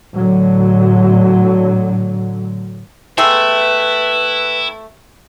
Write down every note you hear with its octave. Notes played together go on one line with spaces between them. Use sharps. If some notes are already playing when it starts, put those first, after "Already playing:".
A2 D3 F#3
G#3 A3 B3 E4 B4 G5 E6